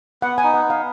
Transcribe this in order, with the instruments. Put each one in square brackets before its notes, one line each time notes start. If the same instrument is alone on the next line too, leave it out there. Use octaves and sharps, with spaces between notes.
[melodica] B3 [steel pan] F#5
[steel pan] G#5
[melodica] D#4
[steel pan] F#5
[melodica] B3 [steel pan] F5